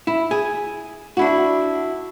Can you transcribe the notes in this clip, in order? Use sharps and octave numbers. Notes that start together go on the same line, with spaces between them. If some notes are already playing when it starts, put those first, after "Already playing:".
E4
G#4
D4 E4 F#4